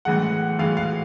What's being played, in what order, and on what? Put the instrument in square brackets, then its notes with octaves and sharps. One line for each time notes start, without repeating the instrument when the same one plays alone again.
[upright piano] A2 E3 G#3 F#5
A2 E3 G#3 F5
F5